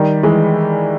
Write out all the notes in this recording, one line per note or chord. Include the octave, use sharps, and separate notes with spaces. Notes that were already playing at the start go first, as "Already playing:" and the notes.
Already playing: D#3 G3
E3 G#3